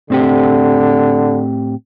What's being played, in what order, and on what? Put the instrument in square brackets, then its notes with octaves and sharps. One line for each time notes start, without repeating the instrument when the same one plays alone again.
[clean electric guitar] A2 C4 G4 [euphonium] D3